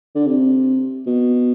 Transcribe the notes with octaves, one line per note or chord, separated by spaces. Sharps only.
D3
C3
B2